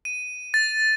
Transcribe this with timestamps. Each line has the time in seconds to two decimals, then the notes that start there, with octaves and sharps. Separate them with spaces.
0.05 D#7
0.54 A6